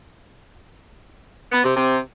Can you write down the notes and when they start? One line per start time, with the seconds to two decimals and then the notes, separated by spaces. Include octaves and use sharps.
1.52 B3
1.64 C3
1.76 C3